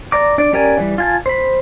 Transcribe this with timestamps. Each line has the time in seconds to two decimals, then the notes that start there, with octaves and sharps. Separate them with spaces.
0.12 D5 A#5 D6
0.38 D4 D5
0.53 C#4 G4 A#4 D5 G#5
0.78 E3 G3
0.98 F4 G#5 A5
1.26 C5 B5